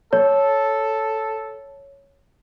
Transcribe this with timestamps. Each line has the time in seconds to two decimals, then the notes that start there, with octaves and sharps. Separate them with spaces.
0.13 A4 C#5